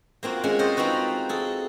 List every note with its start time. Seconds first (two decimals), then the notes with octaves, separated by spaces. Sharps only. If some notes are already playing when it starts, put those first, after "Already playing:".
0.23 A#3 C4 F4 F#4
0.44 G#3 C4 C#4
0.59 A4 C5 C#5 D#5
0.77 C4 D#4 F4 F#4 B4
1.29 G#4 A4